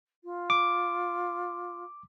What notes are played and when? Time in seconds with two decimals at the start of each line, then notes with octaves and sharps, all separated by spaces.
0.24 F4
0.50 D6